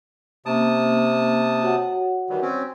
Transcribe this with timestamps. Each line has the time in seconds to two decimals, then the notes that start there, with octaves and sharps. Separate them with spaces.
0.46 C3 A#3 C#4 A5 D#6
1.62 F#4 C#5 F#5
2.30 D#3 E3 G3
2.42 C4 C#4